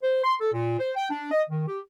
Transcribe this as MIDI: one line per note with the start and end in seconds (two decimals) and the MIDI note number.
0.02 0.23 72
0.24 0.34 84
0.40 0.51 69
0.52 0.75 46
0.79 0.91 72
0.96 1.09 79
1.10 1.31 62
1.31 1.42 75
1.49 1.65 51
1.67 1.79 67